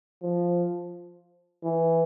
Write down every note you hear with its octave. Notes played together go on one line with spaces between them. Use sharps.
F3
E3